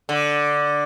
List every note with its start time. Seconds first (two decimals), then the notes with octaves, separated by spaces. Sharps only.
0.09 D3